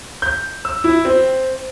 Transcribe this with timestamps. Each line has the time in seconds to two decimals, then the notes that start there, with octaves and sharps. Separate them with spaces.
0.22 G6
0.65 E6
0.84 E4
1.05 C4